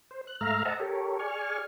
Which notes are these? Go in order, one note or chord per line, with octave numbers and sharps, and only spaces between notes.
C5
F#6
G#2 A3 E5 F5 A#5 F6
C5 D#5 E5 F#5 A5 A#5
G4 A4 A#4 C#5
G#4 D5 G#5 C#6 F6